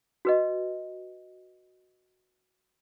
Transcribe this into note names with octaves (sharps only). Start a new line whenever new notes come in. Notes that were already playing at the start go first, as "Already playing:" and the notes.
F#4 B4 D#5